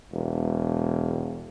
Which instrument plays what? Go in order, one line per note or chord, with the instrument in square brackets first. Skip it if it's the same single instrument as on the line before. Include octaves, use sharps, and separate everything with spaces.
[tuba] E1